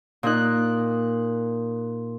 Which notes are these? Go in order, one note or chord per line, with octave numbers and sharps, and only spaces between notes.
A#2 D#4 F#6